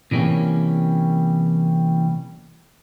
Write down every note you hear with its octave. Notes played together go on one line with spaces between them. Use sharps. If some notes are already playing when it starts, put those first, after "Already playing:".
C3 E3 G3 A#3 C#4